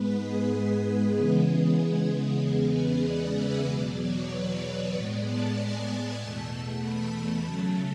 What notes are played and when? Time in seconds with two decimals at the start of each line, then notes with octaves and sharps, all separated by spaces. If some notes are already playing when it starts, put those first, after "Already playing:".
Already playing: G#2 G#3 B3 B4
0.22 G#4
0.85 G#4
1.16 C#3 E3 G#3 B3
2.42 E2 C#3 G#3 B3 G#4
2.73 B4
3.04 D5
3.36 E5
3.67 E2 B2 F#3 D5
3.99 C#5
4.30 B4
4.62 B4
4.93 A2 G#3 B3 D5
5.24 A5
5.56 G#5
6.18 E2 B2 A3 A5
6.50 A5
6.81 B5
7.44 C#3 F#3 A3 A5